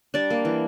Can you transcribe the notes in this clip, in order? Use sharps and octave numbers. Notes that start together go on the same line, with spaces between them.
G3 D4 D5
A#3
E3